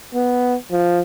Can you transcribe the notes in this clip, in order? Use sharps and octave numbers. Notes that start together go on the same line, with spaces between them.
B3
F3